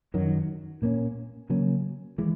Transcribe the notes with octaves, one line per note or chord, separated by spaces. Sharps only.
F#2 D#3 F#3
A#2 A#3 C#4
C#3 F#3 A#3 C#4
E3 G#3